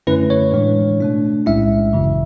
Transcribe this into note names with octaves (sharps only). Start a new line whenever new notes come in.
F#2 D3 A3 C#4 E4 B4
C#5
A2 E3 G#3 D4
B2 A3 D4
B1 A2 G#3 C#4 E4 E5
G#1 F#2 C#3 E3